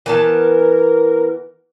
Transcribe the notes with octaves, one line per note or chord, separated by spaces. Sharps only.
E3 B3 A#4 A5